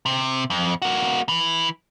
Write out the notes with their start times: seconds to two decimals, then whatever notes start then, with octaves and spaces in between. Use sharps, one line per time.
0.06 C3
0.50 F2
0.82 A#3 F#4
1.29 E3